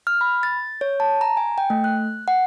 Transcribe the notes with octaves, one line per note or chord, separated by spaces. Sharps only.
F6
B5
A6
C#5
A5
A#5
G#5
G5
A3
F#6
F#5